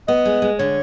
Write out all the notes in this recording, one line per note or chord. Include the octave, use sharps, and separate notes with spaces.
B3 D#5
G#3
G#3
D3 C#5